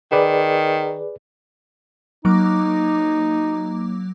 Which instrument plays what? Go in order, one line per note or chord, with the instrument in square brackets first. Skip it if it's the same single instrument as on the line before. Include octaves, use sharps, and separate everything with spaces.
[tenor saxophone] D#3 [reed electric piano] G#4 B4 D5
[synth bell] F#3 A#3 D6 [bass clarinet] D#4